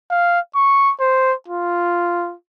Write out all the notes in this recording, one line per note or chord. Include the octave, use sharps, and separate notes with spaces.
F5
C#6
C5
F4